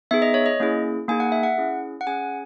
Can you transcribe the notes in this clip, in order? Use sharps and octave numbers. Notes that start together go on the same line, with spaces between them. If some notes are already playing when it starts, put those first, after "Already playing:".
B3 D#4 G#4 E5
D#5
C#5
D#5
A#3 C#4 E4 G#4
A#3 D#4 G#4 G#5
F#5
E5
F#5
C#4 E4 G#4
F#5
C#4 G#4 G#5